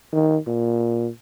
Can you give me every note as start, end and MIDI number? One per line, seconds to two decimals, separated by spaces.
0.13 0.37 51
0.47 1.10 46